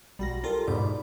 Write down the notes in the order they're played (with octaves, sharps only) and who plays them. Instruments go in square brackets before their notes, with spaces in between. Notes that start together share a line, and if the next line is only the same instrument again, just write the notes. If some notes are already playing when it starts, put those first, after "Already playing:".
[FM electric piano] B1 F#4 A#6 [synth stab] G3
[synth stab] F4 [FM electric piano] G4 A4 A#4
[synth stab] E2 G#2 B2 [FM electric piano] D5 B5